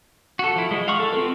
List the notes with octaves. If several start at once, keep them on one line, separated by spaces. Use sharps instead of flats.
F#4 A4
F3 E4
G#3
F5 F#5 C#6
A4
C4 F4 A#4 B4